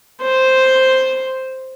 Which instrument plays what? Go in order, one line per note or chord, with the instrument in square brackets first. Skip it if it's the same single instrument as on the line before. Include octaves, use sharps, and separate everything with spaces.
[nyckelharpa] C5